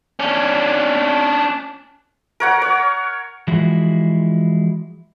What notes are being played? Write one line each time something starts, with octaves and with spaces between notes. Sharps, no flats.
C#4 D4
A#4 C#5 F#5
C#5
E3 F3 G#3 E4 F#4